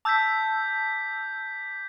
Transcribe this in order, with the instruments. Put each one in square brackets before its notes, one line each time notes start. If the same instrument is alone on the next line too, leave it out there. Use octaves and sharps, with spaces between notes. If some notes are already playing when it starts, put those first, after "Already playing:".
[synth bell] A5 E6 [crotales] D6 G6 B6